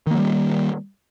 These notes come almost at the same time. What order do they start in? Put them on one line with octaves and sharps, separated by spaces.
D#3 A#3 F#3 G3